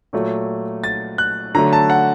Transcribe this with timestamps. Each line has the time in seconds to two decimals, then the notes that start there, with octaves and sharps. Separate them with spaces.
0.13 A#2 F#3 A3
0.84 A6
1.18 F#6
1.55 D3 F#3 A3 A#5
1.73 A5
1.90 F#5